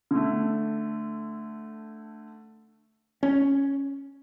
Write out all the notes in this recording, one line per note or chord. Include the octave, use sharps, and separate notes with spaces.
D3 A3
C#4